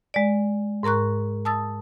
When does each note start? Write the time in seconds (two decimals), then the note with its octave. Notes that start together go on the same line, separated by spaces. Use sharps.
0.14 G#3 D5
0.83 G#2 A#4 A#5 C#6 F#6
1.45 A5 D#6 E6 A6